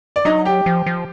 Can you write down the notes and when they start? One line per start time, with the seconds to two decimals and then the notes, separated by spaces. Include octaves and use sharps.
0.16 D5
0.25 F#3 D#4 D#5
0.45 G4 G5
0.66 F3
0.86 F3